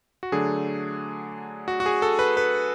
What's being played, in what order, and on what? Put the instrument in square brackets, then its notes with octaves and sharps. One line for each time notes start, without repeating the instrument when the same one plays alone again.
[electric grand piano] F#4
D3 F#3 A3 D4 G#4
F#4
F#4
G#4
A4
B4
B4